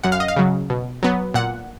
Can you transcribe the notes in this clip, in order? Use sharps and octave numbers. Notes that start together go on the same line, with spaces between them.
F#2 F#5
F5
D#5
F5
C#3 F#3
B2
F#3 B3
A#2 F#5